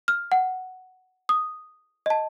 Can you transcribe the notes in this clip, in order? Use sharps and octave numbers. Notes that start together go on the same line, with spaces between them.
F6
F#5
D#6
D#5 A5